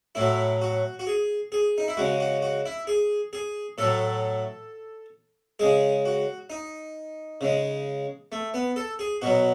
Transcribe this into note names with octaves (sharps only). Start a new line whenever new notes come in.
A2 F#3 E4
F#4
F#4
G#4
G#4
D#4
E4
C#3 G#3 F#4
F#4
F#4
E4
G#4
G#4
A2 F#3 A4
C#3 G#3 G#4
F#4
D#4
C#3 G#3
A3
B3
A4
G#4
B2 F#3 F#4